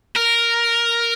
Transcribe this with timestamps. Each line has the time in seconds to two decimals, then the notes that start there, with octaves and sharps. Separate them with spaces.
0.16 A#4